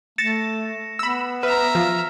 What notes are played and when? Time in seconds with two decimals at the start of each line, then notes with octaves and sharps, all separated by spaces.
0.18 A3 A6 A#6 C#7 E7
0.99 B3 B5 E6
1.43 B4 E5 A#5 F6
1.75 F3 F4